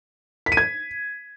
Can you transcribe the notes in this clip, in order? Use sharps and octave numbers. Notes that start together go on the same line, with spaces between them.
B6
D#7
G#6